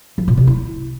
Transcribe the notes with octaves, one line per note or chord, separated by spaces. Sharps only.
F3
A#2
C3
E4